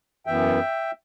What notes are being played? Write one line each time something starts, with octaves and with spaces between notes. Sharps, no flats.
F#2 E3 B3 E5 G5